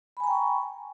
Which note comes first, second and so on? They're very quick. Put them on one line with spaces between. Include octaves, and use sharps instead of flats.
B5 G#5 A#5 G5 C#6